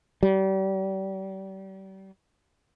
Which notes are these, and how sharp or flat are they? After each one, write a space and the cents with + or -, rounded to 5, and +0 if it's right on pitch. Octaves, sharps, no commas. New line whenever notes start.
G3 -35